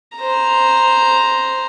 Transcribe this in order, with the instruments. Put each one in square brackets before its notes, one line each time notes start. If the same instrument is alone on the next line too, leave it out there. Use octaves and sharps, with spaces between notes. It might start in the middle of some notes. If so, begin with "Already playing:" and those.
[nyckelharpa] C5 A#5